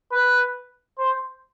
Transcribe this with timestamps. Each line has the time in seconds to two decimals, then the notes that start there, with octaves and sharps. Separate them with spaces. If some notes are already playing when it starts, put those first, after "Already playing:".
0.12 B4
0.98 C5